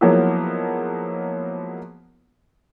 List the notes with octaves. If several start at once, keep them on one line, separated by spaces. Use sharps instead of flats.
F3 F#3 G#3 A#3 B3 E4